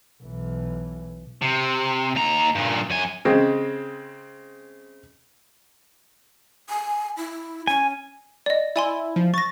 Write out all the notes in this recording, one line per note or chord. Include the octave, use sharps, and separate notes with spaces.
B1 E3
C3
D#2 A#5
G2 A#2
F#2 G#5
C#3 G#3 C4
G#5
E4
C#4 G#5
D5 D#5
E4 D5 G#5 C6
F3
C#6 A6 A#6